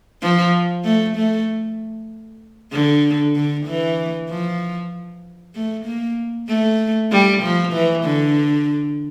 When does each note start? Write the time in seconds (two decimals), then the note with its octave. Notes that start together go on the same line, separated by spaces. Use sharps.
0.22 F3
0.84 A3
1.17 A3
2.73 D3
3.35 D3
3.67 E3
4.30 F3
5.55 A3
5.85 A#3
6.48 A3
7.12 G3
7.43 F3
7.73 E3
8.04 D3